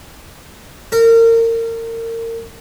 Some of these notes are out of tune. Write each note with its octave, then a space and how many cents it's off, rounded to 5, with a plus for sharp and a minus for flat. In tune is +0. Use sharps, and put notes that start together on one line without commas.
A#4 -30